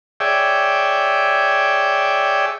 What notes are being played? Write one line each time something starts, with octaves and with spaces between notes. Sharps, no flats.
G#4 C#5 D5 E5 G5